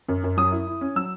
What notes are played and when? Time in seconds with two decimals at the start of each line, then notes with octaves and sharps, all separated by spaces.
0.08 F#2
0.24 F#2
0.37 F#3 D#6
0.52 E4
0.67 E4
0.81 C#4
0.96 F#3 E6